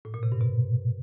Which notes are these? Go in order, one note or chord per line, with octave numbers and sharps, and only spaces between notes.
A2
A#2
C3
G2
B2